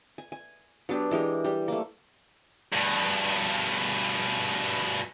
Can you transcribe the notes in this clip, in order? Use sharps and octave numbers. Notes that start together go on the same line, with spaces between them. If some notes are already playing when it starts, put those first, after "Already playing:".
G#5
G#5
F#3 B3 D4 G4
E3 G#3 G4 A#4
G3 G4
A3 A#3
G2 B2